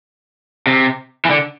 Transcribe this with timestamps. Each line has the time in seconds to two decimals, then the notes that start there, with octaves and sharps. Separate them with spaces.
0.67 C3
1.25 E3
1.30 D3